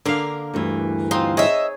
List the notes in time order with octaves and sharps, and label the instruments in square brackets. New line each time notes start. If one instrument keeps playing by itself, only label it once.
[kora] D3 F5 [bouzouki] A#3 A#4
[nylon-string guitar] D2 G2 E3
[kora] C4 D#4 [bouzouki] F4
[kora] G#4 C#5 [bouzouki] D#5 E5